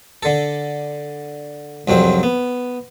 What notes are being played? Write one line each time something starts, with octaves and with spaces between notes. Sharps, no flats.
D3 A4
C2 F2 F#3 C4
B3